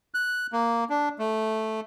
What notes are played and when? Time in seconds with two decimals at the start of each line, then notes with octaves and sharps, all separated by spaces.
0.14 F#6
0.53 A#3
0.90 D4
1.19 A3